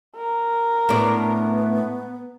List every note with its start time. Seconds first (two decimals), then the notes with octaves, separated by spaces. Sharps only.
0.16 A#4
0.89 A2 B3 D4